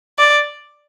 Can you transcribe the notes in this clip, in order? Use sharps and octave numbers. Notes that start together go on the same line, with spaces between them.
D5